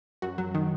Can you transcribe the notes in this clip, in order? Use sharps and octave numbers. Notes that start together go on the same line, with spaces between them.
F#2 F#4
F#3
D#3